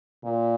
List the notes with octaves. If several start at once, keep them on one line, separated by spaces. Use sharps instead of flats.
A#2